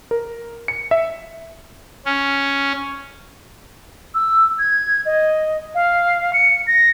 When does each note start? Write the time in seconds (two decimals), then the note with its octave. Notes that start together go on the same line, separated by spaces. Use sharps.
0.11 A#4
0.68 C#7
0.91 E5
2.06 C#4
4.14 E6
4.59 G#6
5.05 D#5
5.75 F5
6.33 C#7
6.67 A#6